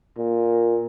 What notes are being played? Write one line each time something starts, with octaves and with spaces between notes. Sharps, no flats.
A#2